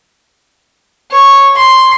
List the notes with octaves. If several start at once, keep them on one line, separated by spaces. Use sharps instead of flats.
C#5
C6